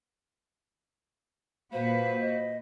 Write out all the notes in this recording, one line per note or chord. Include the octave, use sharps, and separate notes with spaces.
A#2 F#4 B4 C5 F5
D#5